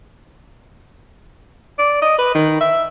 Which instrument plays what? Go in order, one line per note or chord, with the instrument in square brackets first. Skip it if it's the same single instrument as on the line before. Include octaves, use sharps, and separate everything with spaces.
[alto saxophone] D5
D#5
B4
D#3
E5